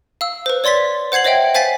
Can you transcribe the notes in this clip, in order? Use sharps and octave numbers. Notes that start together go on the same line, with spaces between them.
F5 E6
B4 C5
C#5 D5 C6 A6 B6
C5 F#5 G#6 C7 F#7
C5 C#5 D#5 E5 F#5 G5
C5 F5 G#5 A6 B6